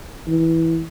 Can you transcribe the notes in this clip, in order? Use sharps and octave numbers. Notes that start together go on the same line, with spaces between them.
E3